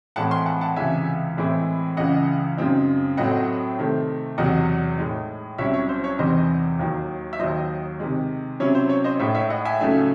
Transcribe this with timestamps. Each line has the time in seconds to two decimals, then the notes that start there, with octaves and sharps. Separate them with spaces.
0.16 A2 E3 G#3 C4 F#5 A5
0.31 G#5 C6
0.46 F#5 A5
0.61 F#5 A5
0.76 C#2 C3 E3 G#3 E5 G#5
1.37 A2 E3 G#3 C4 E4
1.97 C#2 C#3 E3 D#5 F#5
2.57 F#2 C#3 G#3 C4 D#4
3.17 A2 F#3 A3 C4 D#5 F#5
3.78 C3 D#3 A3 C4
4.38 E2 C3 F#3 D#5 F#5
4.98 A2 G#3 D#4
5.58 C2 C3 F#3 C#4 E4 C#5 E5
5.74 C#5
5.89 C5
6.04 C#5
6.19 E2 C3 E3 C4 D#4 C5 D#5
6.79 D#2 D#3 F#3
7.33 E5
7.39 D#2 D#3 F#3 C5 D#5
8.00 C3 D#3 G#3
8.60 C3 F#3 C#4 E4 C#5
8.75 C5
8.89 C#5
9.04 C5 D#5
9.20 A2 G#3 D#4 C#5 E5
9.35 C#5 E5
9.50 D#5 F#5
9.65 E5 G#5
9.80 C#2 C#3 F#3 A3 D#4